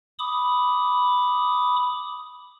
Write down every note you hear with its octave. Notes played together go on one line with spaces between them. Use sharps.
B5 D6 D#6